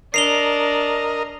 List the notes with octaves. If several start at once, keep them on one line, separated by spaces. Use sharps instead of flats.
D4 A#4 D#5 C7 F7 G7